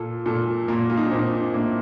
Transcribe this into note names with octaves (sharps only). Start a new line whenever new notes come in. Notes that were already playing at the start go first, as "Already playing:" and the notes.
Already playing: A#2 F4 A4
A#2 F4 A4
A#2 A#3
F4
D#4
D4
A#2 C4
A2 A#3 D4